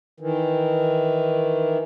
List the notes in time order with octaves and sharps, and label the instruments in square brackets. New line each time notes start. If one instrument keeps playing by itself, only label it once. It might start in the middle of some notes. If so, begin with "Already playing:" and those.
[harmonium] D#3 E3